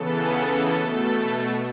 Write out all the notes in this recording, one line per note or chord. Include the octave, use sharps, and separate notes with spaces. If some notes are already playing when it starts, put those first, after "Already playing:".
Already playing: C#3 E3 B3 A4
B2 A3